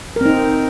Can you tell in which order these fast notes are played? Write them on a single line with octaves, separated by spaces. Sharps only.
A#4 C4 D#4